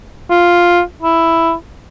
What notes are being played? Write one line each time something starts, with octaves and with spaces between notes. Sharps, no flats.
F4
E4